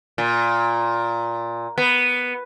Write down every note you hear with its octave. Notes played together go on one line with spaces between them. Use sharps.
A#2
B3